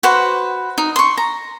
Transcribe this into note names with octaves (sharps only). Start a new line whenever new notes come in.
F#4 B4 C5
D#4
C6 C#6
A#5